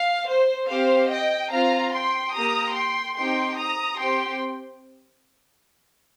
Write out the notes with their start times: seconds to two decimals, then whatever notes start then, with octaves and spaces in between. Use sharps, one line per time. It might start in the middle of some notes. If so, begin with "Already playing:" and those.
Already playing: F5
0.28 C5
0.70 C4 G4 C5 F5
1.11 D#5 G5
1.52 C4 F4 F5 A#5
1.93 G5 C6
2.34 A#3 G4 A#5 D#6
2.76 G5 C6
3.17 C4 D#4 G4 G5 C6
3.57 A#5 D#6
3.99 C4 G4 G5 C6